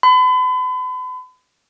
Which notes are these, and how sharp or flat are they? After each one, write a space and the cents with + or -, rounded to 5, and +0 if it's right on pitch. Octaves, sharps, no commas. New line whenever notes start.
B5 +40